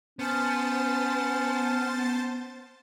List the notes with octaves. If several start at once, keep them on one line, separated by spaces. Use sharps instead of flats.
B3 C#4 C5 A5 A6